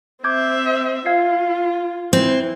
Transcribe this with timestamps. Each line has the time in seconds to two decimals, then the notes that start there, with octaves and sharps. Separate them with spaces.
0.24 C4 E5 D6 G6 G#6
1.06 F4 F5 G#6 C7
2.13 E3 C4